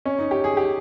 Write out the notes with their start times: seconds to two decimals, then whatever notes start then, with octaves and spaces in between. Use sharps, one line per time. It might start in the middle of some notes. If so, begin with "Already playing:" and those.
0.06 C#4
0.19 D#4
0.31 G4
0.44 G#4
0.57 G4